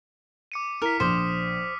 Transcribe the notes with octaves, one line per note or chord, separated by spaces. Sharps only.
D6 C#7 D#7
E4 A#4 F6 B6
A#1 C5 D6 D#6 F6
D#6